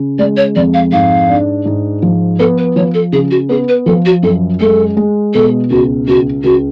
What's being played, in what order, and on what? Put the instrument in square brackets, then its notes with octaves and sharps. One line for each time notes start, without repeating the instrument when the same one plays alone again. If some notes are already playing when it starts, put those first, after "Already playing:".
Already playing: [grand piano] C#3
[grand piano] G#3 [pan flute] D5
[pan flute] C#5
[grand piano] F2 [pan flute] D5
[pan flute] F5
[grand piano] G#2 [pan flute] F5
[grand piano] D4
G#2
F3
[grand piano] B3 [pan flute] A4
[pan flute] B4
[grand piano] F3 [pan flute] C#5
[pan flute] A4
[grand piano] C#3 [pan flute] G#4
[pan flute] F#4
[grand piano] B3 [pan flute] G#4
[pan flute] B4
[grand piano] F3 [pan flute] A4
[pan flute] F#4
[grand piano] F#2 [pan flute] A4
[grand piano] G#3 [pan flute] A4
[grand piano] G#3
[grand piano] B2 [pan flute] A4
[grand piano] C#2 [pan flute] F#4
[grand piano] C#2 [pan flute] F#4
[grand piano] C#2 [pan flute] F#4